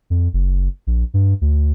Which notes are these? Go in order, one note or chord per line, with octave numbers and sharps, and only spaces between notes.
F2
F#1
A#1
G2
D2